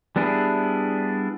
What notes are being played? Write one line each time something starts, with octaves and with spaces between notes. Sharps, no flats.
G3 B3 D4 E4 G#4